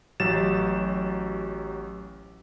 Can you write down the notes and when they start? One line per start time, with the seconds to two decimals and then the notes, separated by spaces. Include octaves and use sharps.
0.20 A1 F#3 G4 A6 E7